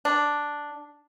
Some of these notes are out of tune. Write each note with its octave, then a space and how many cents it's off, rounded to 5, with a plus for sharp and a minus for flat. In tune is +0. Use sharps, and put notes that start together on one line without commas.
D4 +0